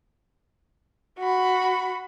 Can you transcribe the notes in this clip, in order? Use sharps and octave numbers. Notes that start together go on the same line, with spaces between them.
F#4 B5